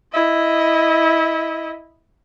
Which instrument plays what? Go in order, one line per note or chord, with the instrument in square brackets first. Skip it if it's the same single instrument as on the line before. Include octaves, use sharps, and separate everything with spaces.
[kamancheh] E4 D#5